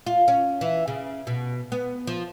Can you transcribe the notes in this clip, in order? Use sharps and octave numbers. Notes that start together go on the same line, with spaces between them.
F4
C#4
E3
C#3
B2
B3
F3